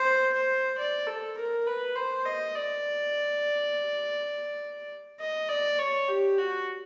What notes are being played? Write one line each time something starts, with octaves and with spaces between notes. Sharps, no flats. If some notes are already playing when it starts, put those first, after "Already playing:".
Already playing: C5
C5
D5
A4
A#4
B4
C5
D#5
D5
D#5
D5
C#5
G4
F#4